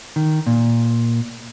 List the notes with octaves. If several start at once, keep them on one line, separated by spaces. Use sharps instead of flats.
D#3
A#2